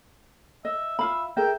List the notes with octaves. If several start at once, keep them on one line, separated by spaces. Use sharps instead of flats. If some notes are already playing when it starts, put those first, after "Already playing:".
D#5 E5
F4 E5 F5 B5
G#4 A#4 E5 G5